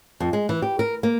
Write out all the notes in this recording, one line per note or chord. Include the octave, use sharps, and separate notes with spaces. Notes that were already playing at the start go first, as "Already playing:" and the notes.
F2
G#3
E3
G4
A#4
A#3